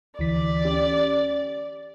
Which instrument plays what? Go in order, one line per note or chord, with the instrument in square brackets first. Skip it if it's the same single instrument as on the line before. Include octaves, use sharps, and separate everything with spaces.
[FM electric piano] D2 E3 B6 [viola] D5
[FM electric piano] C#4 G4